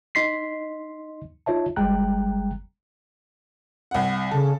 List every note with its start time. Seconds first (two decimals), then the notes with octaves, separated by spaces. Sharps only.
0.15 D#4 D#5 C6 B6 C7
1.46 D#4 F4 C#5 E5 A5
1.76 G1 G3 G#3 G5 A#5 F#6
3.91 C2 F#5
4.31 C#3 A4